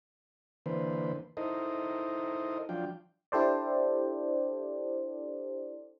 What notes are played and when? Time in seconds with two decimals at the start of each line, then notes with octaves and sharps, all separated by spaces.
0.66 D3 E3 A#3 B4 C5
1.37 D#4 E4 A4 A#4 C5 D#5
2.69 F3 F#3 D4 F4 G5
3.32 D4 E4 G4 A4 C5 D5